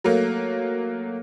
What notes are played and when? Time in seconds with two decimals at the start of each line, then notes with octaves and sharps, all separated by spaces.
0.04 F#3 A3 A#3